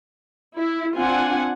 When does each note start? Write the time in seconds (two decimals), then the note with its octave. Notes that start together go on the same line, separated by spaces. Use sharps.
0.59 E4
0.97 C4 D4 F4 F#5 G#5